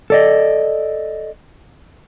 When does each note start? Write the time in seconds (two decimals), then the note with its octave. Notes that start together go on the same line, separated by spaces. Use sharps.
0.10 A4 D5 D#5